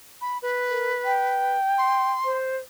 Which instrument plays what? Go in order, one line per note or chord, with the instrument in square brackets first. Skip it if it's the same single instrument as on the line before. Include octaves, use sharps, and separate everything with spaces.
[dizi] B5
B4
[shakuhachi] A#4
G5
[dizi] C6
[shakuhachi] C5